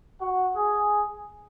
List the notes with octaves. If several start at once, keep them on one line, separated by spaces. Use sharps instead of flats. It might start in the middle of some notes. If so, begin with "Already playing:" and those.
F#4 F#5
G#4 G#5